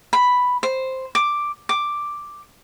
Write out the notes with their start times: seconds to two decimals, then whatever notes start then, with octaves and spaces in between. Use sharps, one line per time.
0.13 B5
0.63 C5
1.15 D6
1.69 D6